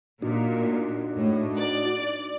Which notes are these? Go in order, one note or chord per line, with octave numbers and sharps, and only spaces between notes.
A#2 D4 D#4 F#4
A2
D5